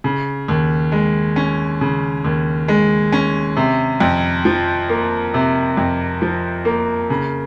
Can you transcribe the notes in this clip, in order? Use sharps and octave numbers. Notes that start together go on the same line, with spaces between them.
C#3
D#2
G#3
C#4
C#3
D#2
G#3
C#4
C3
F2
F3
A#3
C3
F2
F3
A#3
C#3